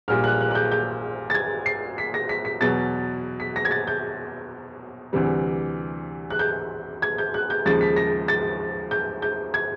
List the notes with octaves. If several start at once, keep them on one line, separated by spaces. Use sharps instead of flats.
A#1 A#2 G3 F6
F#6
F#6
F#6
G6
G6
A6
G#6
C7
B6
A#6
B6
B6
E2 B2 F#3 A6
B6
A#6
G#6
A6
G6
D2 C3 E3 G3
F#6
G6
G#6
G6
F#6
G6
D#2 C#3 F3 G#3 A6
B6
A#6
A6
G6
G6
G#6